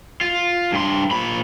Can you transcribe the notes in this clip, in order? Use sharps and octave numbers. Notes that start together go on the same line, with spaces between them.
F4
G2 C6
A#2 B5